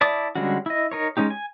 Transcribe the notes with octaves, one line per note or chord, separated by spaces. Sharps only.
E4 D5 A5 D6 D#6
D3 G3 G#3 C#4 F#4
E4 D#5
D#4 A#4 C#5
G#3 C#4 D#4 G4
G#5